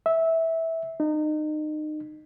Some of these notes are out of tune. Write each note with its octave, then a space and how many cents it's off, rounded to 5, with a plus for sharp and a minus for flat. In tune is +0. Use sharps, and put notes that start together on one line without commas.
E5 -15
D#4 -30